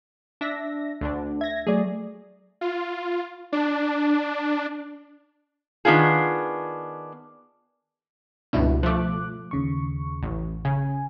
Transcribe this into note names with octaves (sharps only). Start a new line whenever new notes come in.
D4 E5 A#6
D2 D3 D4
E5 G#6 A#6
F#3 A3 G#4 D5
F4
D4
D#3 B3 D4 F4 G#4
C#2 G2 B2 D4 E4
F3 A3 D6 F#6
D#2 C#3 C#6
A1
C#3 G#5